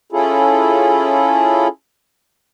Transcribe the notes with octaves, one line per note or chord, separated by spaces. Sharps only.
C#4 E4 F4 G#4 A4